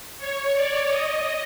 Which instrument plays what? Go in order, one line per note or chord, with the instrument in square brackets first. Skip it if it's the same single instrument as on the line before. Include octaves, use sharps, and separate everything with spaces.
[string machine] C#5
D5
D#5